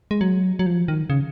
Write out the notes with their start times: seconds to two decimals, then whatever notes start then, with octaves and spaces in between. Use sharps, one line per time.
0.11 G#3
0.21 F#3
0.59 F#3
0.66 F3
0.88 D#3
1.10 C#3